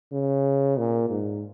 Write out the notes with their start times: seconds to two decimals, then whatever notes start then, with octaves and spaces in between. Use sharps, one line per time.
0.12 C#3
0.78 A#2
1.10 G#2